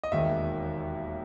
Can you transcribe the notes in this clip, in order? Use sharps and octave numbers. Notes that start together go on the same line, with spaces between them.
D#5
E1 D#2 D#3 E5